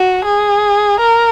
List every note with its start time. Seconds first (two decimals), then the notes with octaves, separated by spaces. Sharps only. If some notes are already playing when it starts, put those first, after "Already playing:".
Already playing: F#4
0.25 G#4
1.00 A#4